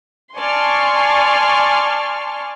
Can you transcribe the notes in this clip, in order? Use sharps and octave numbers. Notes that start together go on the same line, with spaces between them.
D5 G#5 A5 C6 C#6 F6